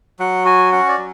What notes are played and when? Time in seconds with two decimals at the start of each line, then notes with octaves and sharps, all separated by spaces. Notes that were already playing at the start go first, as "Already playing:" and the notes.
0.19 F#3 F#5
0.45 F#4 G#5
0.72 C#4 F#5
0.88 D5
0.98 F#3